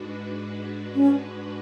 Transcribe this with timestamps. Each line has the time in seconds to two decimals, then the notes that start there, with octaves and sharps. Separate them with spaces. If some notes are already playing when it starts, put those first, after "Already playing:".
Already playing: G#2 G#3 D4 F#4 B4
0.95 C#4